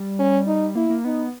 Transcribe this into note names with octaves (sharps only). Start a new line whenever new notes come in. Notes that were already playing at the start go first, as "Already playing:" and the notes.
Already playing: G3
C#4
D#4
A#3 E4
A#3
B3 D#4